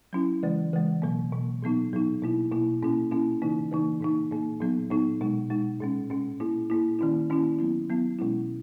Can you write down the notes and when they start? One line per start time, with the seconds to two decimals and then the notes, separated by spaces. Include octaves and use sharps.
0.13 F#3 C#4 E4
0.43 C#3 E3 G#3
0.73 C#3 E3 G#3
1.02 B2 F#3 A#3
1.33 B2 F#3 A#3
1.62 A#2 F#3 B3 D#4
1.93 A#2 F#3 B3 D#4
2.22 B2 A#3 E4
2.52 B2 A#3 E4
2.82 A#2 A#3 C#4 E4
3.11 A#2 A#3 C#4 E4
3.42 C#3 E3 A#3 D#4
3.71 C#3 E3 A#3 D#4
4.01 A#2 A#3 D#4
4.31 A#2 A#3 D#4
4.61 A#2 F#3 B3 D#4
4.90 A#2 F#3 B3 D#4
5.21 B2 G#3 D#4
5.50 B2 G#3 D#4
5.81 A#2 G#3 C#4
6.10 A#2 G#3 C#4
6.40 A#2 A#3 E4
6.70 A#2 A#3 E4
6.99 D#3 A#3 C#4 E4
7.30 D#3 A#3 C#4 E4
7.59 F#3 B3 E4
7.90 F#3 B3 E4
8.19 B2 G#3 C#4 E4